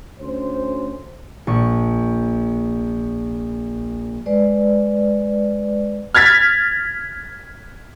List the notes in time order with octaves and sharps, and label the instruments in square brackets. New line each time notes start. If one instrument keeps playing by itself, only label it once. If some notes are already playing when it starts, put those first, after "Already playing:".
[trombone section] D2 C#4 C5
[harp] A#1 C#6
[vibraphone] G#3 B4 D5
[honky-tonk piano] F6 G#6 A6 B6